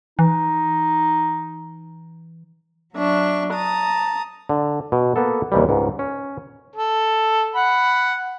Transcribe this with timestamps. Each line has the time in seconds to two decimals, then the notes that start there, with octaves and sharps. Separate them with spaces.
0.19 E3 D#4
2.95 F#3 D4 E5 C#6
3.53 A5 A#5 D#6
4.49 D3
4.92 B2
5.16 A#3 B3 A4
5.52 D#2 C3 E3 G3
5.69 C#2 G#2
5.99 C#4
6.75 A4
7.55 F#5 B5